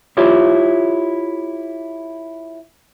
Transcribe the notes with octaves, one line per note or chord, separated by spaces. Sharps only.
E4 F4 G4 C#5